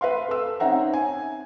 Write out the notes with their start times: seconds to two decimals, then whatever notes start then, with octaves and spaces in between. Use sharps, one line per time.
0.01 B4 E5 F5 C6
0.28 A4 E6
0.60 C4 C#4 D#4 E5 F#5 A#5
0.93 G#5